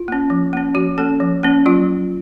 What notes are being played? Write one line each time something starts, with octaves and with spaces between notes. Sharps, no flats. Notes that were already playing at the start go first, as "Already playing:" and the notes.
Already playing: F4
A#3 C#4
F3
A#3 C#4
F3 F#4
A#3 C#4 A4
F3
A#3 C#4
F#3 F4